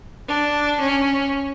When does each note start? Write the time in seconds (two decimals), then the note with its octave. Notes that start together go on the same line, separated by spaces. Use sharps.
0.27 D4
0.80 C#4